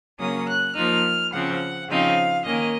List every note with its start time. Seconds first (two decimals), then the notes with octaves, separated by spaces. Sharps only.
0.19 C#3 F#3 A#3 C#4 D#6
0.48 F#6
0.75 F3 A#3 D#4 F6
1.32 C#3 F3 C4 F#5
1.88 C#3 F3 C4 D#4 F5
2.45 D#3 A#3 C#4 D#5